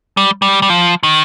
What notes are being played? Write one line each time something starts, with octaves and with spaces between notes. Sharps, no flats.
G3
G3
G3
F3
D#3